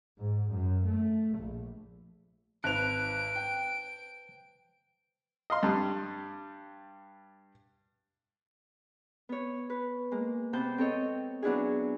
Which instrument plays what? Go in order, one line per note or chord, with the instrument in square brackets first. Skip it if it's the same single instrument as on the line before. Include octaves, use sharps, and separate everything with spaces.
[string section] G#2
F#2
A3
A#1
[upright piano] G#1 F7 [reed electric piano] B4 C5 A5 [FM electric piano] F#6 [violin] D7
[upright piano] G5
[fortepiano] D#5 F5 C6
G2 G3
[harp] B3 C#5
B4
G#3 A#3
C3 B3 C5 A5 G6
C4 A4 C#5 D#5
F#3 B3 D4 E4 G#4